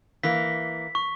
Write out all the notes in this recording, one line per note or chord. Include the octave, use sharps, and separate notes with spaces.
E3 A#3 B6
C#6